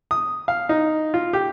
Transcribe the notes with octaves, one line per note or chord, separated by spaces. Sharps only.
D#6
F5
D#4
F4
G4